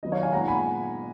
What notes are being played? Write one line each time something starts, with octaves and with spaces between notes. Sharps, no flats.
D#3 F#3 B3 D#5
C#5 F5
F5 G#5
A#2 G#3 B3 F#5 A#5
G#5 B5